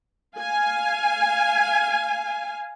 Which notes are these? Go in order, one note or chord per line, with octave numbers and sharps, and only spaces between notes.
F5 G#5